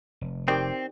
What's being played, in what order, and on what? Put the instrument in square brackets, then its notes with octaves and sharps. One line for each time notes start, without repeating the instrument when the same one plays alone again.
[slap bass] F1
[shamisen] D#3 [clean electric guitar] C4 [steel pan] G4 D5 G5